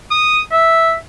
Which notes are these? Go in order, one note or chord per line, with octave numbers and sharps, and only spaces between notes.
D#6
E5